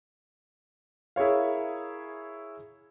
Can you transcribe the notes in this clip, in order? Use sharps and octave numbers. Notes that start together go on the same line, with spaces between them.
E4 G#4 A#4 C#5 F5